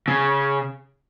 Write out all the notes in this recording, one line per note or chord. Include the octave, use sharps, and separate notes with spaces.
C#3